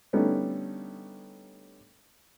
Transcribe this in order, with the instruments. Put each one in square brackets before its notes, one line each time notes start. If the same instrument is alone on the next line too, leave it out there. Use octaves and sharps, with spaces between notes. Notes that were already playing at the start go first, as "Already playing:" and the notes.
[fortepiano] D3 G3 A3 B3 C#4 D#4